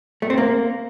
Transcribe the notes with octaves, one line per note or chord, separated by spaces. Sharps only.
A3
C4
A#3